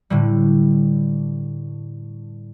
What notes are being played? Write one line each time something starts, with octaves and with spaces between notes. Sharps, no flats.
A2 D3 G3